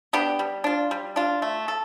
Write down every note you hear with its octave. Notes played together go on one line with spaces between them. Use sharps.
B3 D4 G4
G3
D4 F4
G3
D4 F4
A3
A4